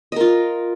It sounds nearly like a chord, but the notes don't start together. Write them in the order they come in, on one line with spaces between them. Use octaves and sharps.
D#5 A#4 F4